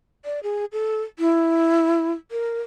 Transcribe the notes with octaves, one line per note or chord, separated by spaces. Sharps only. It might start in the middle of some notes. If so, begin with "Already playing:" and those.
D5
G#4
A4
E4
A#4